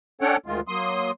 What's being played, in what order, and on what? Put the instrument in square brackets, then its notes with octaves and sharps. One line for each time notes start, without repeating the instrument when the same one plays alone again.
[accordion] C#4 D4 A4 C#5 F#5 G5
D2 D#3 G#3 F4
F#3 A#3 C6 D#6